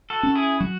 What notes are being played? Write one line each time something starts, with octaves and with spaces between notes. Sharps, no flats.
F#4 A4
C#4
E4 G#4
F#3 F#4